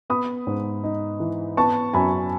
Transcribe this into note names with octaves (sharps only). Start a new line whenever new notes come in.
B3 B5 D#6
G#2
D#4
E3
B3 A5 C#6
F#2 G#5 B5